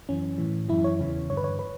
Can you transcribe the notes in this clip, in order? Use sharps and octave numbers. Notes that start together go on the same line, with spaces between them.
F#2 E3 C#4
A2 E3
F#2 E3 E4
C#5
E2 C#3 E3
G2 D3 C#5
B4
C#5
B4